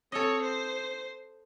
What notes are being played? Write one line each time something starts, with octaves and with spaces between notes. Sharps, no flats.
C4 A4 C#5 D#5
C5